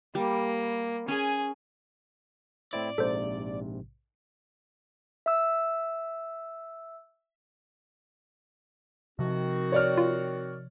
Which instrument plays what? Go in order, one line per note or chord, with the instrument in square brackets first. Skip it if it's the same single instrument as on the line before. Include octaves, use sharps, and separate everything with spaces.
[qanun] G3 [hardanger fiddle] A#3
[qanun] C#4 [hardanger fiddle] G#4 G#5
[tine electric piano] A2 C4 E4 [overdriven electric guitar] D5
[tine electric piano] A#1 G#2 C3 [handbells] A4 C5
[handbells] E5 E6
[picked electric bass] C3 F3 [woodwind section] D#3 C4 F#4
[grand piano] C#5 D5 F6
[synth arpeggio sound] F4